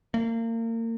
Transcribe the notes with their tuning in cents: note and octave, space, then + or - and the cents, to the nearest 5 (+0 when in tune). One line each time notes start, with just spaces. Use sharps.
A#3 -35